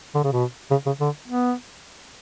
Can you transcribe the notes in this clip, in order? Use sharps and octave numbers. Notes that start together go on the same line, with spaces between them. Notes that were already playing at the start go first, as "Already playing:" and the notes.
D3
C#3
B2
C#3
C#3
D3
B3